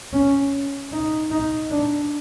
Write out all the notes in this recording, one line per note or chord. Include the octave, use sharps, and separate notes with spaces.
C#4
D#4
D#4
D4